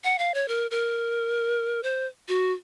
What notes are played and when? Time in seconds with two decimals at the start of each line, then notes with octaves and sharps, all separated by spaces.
0.04 F#5
0.19 F5
0.34 C#5
0.48 A#4
0.71 A#4
1.83 C5
2.28 F#4